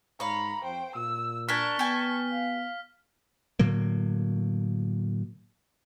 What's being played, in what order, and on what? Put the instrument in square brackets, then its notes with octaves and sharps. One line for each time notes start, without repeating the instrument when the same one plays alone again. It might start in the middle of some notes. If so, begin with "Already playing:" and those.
[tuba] G#2 [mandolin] C#5 F5 [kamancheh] A#5 B5
[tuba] F2 [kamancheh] C5 G5
[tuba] A#2 [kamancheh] E6
[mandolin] D4 A#4 G#5 [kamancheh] A5 C#6 [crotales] F6 B6
[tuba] B3 [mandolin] G4 G#5
[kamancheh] F5
[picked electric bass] A2 D3 F#3 A#3